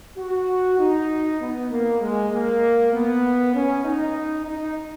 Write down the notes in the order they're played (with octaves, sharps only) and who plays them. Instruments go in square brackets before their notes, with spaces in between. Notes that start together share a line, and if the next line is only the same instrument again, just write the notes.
[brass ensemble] F#4
D#4
B3
A#3
G#3
A#3
B3
C#4
D#4
D#4